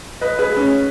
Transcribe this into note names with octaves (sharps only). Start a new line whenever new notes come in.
B4 D#5
G#4 B4
C#4